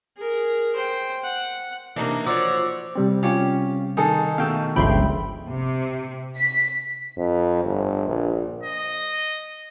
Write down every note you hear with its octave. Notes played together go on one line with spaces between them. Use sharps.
G#4 A#4
C5 G5
F#5
C3 E3 A#3 D4 D#4
F3 F#4 C#5 D5 D6 E6
C3 G3 C4
C#4 F4 G4
D#3 D#4 G#4 A4
B2 D#3 A3 F5 G5 E6
G1 C#2 F3 E5 G5 B5 C6
C3
B6
F2
G1
A#1
D#5